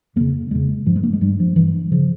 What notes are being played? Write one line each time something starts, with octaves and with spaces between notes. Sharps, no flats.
F2 C#3 A#3
E2 C#3 G#3
G2 F3
G#3
A#3
G#3
G2 G3
F3
G2 E3
C#3 F3